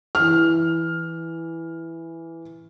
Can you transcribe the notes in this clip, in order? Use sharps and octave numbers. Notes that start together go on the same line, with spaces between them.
E3 F6